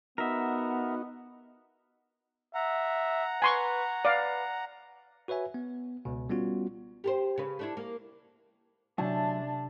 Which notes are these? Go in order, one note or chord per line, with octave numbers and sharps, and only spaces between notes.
B3 D#4 F#4 A#4 E5
E5 F#5 A#5
B4 G#5 C6 C#6
B4 D5 F5
F#4 B4 C#5 E5 G#5
B3
C#2 B2
G3 B3 C#4 F4 F#4
G4 A4 C5
C#3 B4
A3 D4 E4
A#3
C3 F#3 A3 D4 A5